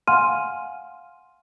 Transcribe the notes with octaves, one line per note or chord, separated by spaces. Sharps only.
F5 F#5 G#5 C6 F6 D#7